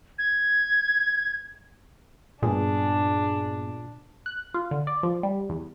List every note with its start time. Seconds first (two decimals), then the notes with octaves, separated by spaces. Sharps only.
0.19 G#6
2.43 G2 A#2 B3 D4 G#4
4.26 F#6
4.54 F4
4.71 D3
4.87 D5
5.03 F3
5.23 G3
5.49 E2